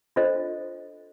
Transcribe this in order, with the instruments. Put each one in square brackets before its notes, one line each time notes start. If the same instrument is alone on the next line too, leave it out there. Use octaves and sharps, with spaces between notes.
[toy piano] D4 F4 A4 C5 D#5